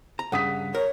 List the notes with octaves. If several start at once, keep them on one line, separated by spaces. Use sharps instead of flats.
A#5
G2 C#3 F#5 D#6 B6
A#4 C#5